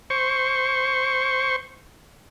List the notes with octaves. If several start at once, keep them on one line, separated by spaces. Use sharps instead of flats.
C5 C#6